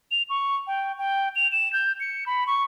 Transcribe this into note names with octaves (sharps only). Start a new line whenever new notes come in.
F7
C#6
G5
G5
F7
E7
G6
C#7
B5
C#6